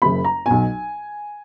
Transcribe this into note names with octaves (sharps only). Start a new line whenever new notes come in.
F#1 F#2 C#3 B5
A#5
B1 B2 G#5